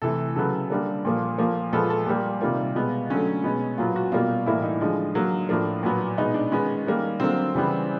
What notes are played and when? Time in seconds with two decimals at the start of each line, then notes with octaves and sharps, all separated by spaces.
0.02 C3 E3 A3 A4
0.36 C#3 F#3 B3 A4
0.70 D3 G3 A#3
1.05 A#2 F3 A#3
1.38 A#2 F3 A#3
1.73 A#2 F3 G#3 B3 A4
1.90 A4
2.07 A#2 G3 A#3 G4
2.41 C3 D#3 G3 A#3 F4
2.75 B2 G#3 B3
3.10 D3 F#3 A3 C#4
3.44 B2 G#3 B3
3.78 A#2 F#3 B3 F4
3.96 F#4
4.12 B2 G3 A#3 F4
4.46 A2 E3 G3 A#3 E4
4.64 D#4
4.81 D3 F3 G#3
5.15 D3 F#3 A#3
5.49 A2 F3 A#3 D4
5.83 A#2 F#3 B3
6.17 B2 G#3 B3 D#4
6.34 D4
6.51 D#3 G#3 B3 C#4
6.86 D#3 G3 A#3
7.20 D3 F#3 A#3 C4
7.55 C#3 E3 G3 B3